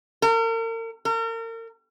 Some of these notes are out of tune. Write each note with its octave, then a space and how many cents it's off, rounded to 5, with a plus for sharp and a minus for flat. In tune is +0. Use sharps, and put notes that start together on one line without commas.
A#4 -40
A#4 -40